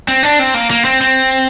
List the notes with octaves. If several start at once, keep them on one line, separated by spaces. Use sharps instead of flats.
C4
D4
C4
A#3
A#3
C4
C4